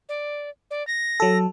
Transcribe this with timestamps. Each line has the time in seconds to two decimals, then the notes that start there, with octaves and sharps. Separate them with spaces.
0.09 D5
0.71 D5
0.87 A#6
1.20 F#3 A4